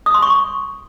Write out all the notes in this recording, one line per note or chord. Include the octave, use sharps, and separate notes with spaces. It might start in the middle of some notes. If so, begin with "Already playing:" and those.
D#6
C6
C#6